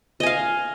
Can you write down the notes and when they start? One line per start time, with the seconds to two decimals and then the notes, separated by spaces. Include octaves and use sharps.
0.20 D#5
0.23 G#5
0.26 F5